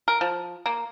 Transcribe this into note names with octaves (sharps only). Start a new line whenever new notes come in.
A#4
F3
A#3